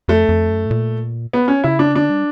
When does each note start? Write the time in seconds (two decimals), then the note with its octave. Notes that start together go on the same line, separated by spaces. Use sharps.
0.08 F2 A3
0.29 F2
0.50 F#2
0.66 A2
0.71 A#2
1.33 B3
1.48 C#4
1.64 C#3 E4
1.79 D4
1.95 D3 D4
2.10 G3